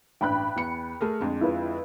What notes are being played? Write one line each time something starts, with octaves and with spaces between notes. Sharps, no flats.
A1 G2 G5 B5 F#6
E2 C#7
A3 G#4 A#4
F2 D3 G#3
E4 F4 B4